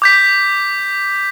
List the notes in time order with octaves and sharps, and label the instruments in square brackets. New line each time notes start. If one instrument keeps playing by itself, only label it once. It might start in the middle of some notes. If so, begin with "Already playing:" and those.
[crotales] D6 G6 B6